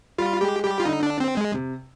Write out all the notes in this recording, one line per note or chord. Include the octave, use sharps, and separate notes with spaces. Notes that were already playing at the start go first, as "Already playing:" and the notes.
G3 F4
G#3 G4
G3 G4
F4
D3 D#4
D4
C4
G#3
C3